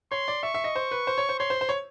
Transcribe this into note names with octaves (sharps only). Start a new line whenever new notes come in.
C#5 C6
D5
E5 C#6
E5
D#5
C5
B4
C5
C#5
C5
C#5 C6
C5
C5
C#5